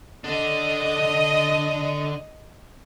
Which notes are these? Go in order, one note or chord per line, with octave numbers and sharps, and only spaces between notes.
D3 D4 D#5